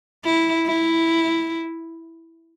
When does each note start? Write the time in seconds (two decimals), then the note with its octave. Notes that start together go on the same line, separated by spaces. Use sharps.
0.25 E4
0.66 E4